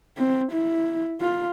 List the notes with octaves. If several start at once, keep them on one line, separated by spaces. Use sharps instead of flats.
C4
E4
F4